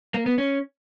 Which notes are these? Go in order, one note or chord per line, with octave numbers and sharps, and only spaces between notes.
A#3
B3
C#4